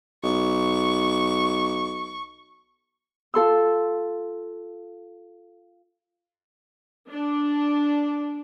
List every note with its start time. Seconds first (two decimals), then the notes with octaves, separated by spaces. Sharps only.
0.23 B1 C#6
3.34 F4 A4 C6 E6
7.09 D4